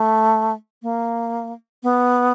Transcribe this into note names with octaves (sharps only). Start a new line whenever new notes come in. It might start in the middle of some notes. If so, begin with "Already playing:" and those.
Already playing: A3
A#3
B3